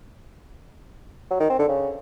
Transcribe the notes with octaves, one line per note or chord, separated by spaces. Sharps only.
F#3
D#3
C4
D3
C#3